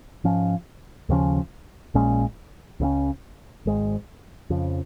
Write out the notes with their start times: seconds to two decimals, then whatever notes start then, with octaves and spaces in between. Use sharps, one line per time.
0.24 G#2 F3 C#4
1.09 D#2 C#3 F3 C#4
1.94 A#1 A#2 G#3 C#4
2.80 C#2 C#3 G#3 C#4
3.66 G#1 G#2 G#3
4.50 F2 C#3 F3